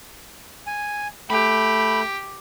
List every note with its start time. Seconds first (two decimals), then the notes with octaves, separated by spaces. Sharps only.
0.67 G#5
1.30 A3 G4 B5